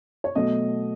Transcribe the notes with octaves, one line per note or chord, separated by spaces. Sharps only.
C#5
B2 F#3 A3 D#5